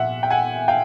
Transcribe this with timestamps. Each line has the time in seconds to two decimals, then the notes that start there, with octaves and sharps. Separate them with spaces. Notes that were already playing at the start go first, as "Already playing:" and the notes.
Already playing: A#2 F3 E5 F#5
0.23 G5
0.30 F#5 G#5
0.68 F5 G5